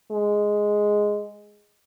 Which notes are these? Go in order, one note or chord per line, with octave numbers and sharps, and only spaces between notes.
G#3